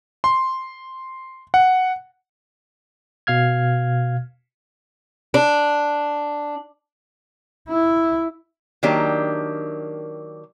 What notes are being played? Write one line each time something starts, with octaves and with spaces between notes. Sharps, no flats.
C6
F#5
B2 F5 F6 G#6
D4
E4
D#3 F#3 A#3 D4 G4